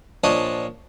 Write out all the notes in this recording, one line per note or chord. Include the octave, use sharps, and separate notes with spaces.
A#2 F3 D4 C#5 D#5